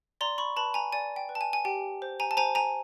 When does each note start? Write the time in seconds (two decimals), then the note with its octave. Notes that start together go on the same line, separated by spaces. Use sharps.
0.21 D5 A#5 C6
0.38 B5 C#6
0.57 B4 A5 B5
0.74 G#5 A#5
0.93 D5 G#5
1.16 G5
1.29 B4
1.35 A5
1.41 G#5
1.53 G#5
1.65 G4 G5
2.02 C5
2.20 G#5 A#5
2.31 A5
2.37 C5 G#5 A#5
2.55 G#5 A#5